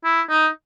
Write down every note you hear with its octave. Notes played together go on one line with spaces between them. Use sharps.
E4
D#4